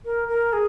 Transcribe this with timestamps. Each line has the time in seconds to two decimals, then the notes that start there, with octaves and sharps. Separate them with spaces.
0.05 A#4
0.28 A#4
0.53 G#4